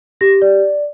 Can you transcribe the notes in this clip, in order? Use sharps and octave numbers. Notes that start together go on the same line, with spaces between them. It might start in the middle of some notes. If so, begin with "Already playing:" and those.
G4 A#6
D5